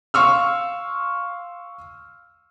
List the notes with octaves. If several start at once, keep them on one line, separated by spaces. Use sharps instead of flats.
F5 C6 C#6 E6 F6